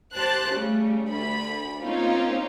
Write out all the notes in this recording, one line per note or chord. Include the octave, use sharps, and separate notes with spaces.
G4 C5 A5 F#6
C#3 G3 A3
D2 B5
A#3 C4 C#4 D#4 F4